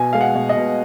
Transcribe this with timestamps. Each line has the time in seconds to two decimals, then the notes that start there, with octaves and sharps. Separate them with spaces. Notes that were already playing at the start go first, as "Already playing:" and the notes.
Already playing: B2 G#5
0.13 G#3 F5
0.21 F#5
0.35 B2
0.49 D#5
0.57 B2